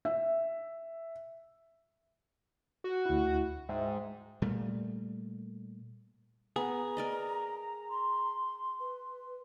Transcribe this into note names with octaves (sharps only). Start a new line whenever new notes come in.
E5
F#4
D2 E4
G#2 E5 G5
A#2 G3 A3
B3 G#4 A#5
A#4 D5 D#5
C6
B4